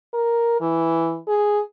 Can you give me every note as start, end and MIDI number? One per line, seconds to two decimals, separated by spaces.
0.13 0.59 70
0.61 1.18 52
1.28 1.61 68